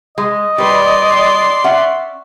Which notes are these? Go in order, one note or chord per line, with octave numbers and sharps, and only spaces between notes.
G#3 D#5
G3 B4 D5 C6
C#4 E5 F#5